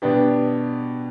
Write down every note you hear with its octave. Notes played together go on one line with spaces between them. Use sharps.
B2 B3 D4 G4